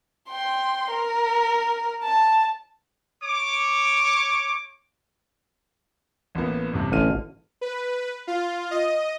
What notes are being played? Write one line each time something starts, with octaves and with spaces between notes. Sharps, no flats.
G5 C6
A#4
A5
C#5 D6
A1 A#3 B3
A1 G2 C3
A1 D3 F6 D#7
B4
F4
D#5